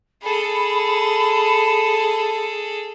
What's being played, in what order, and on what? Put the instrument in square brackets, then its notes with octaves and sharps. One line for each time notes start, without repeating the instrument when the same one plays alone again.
[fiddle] G#4 A4 [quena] B5